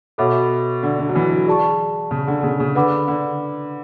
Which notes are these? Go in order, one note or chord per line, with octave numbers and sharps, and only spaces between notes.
B2 A4 C#5 E5 B5 D6
D3
D3
F#3
E3
F#3
G#4 D5 A5 C#6
C#3
D3
C#3
C#3
D3 B4 F#5 B5 D6
D3